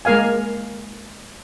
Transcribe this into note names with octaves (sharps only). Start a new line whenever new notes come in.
G#3 A#3 A#4 F5 G#5